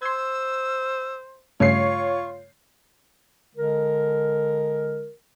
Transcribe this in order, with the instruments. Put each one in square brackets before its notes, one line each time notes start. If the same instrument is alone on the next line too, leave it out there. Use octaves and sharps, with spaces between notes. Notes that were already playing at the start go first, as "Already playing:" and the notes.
[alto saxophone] C5 [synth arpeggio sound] C6 G#6 [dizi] E6
[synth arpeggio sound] G2 C#3 A3 [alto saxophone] F4 [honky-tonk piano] C#5 C7 [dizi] C#6
[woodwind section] D3 G#3 A#4